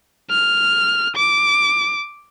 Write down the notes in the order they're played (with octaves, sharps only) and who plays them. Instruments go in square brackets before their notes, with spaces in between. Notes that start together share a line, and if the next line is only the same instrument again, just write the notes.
[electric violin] F6
D6